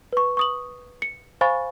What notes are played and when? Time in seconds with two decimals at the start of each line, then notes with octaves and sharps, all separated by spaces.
0.13 B4 C#6
0.37 C#6 D#6 F#7
1.02 C#7
1.41 C5 F5 G#5 B5 C#6 A6